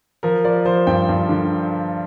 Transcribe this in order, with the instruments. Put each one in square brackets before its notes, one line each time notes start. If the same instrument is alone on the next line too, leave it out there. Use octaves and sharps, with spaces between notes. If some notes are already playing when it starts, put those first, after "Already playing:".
[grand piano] F3 A#4
F3 D5
F3 C5
G2 G5
G2
D3